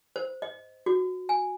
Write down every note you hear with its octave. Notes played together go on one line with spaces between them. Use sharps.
C5
D#5
F#4
G#5